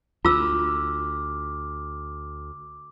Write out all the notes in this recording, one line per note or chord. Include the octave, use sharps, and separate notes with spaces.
D2 F4 D6 E6